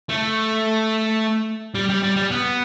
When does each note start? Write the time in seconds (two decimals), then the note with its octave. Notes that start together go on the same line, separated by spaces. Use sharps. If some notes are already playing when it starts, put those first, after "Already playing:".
0.09 A3
1.75 G3
1.89 G3
2.03 G3
2.17 G3
2.31 B3